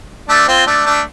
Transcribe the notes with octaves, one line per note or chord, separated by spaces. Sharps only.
A3 D4
C4 F4
A3 D4
A3 D4